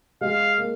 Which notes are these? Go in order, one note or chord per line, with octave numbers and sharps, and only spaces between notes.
G#3 F5
A#3